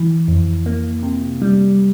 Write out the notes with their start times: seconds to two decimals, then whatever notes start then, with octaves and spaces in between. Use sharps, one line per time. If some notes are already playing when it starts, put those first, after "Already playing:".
Already playing: E3
0.28 F2
0.66 A#3
1.03 C3
1.42 G3